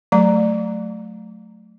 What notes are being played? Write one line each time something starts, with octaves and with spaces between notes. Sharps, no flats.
F#3 A3 A#5